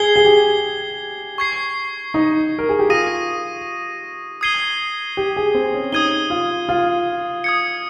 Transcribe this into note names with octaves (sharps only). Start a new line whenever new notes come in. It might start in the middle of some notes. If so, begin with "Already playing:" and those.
Already playing: G#4 G#6 C7 G7
G#4
G4
C#6 G#6 C7
D#4
A#4
G#4
G4
F4 D#6 A#6 D#7
D#6 G#6 C7 D#7 G7
G4
G#4
C4
C#4
D#4 D#6 G#6 D#7 G7
F4
F4
D#6 G#6 C#7